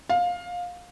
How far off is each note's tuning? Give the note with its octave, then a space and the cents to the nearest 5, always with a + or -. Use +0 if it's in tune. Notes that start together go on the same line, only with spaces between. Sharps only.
F5 +20